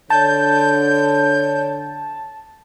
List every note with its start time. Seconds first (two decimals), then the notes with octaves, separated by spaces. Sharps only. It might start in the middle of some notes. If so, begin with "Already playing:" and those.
0.10 D3 C#5 A5 G6